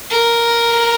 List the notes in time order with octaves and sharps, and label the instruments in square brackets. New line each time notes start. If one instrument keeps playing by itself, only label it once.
[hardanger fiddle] A#4